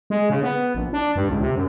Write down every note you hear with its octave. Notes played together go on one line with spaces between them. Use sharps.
G#3
C#3
B3
A#1
D4
G2
C#2
C3
F#2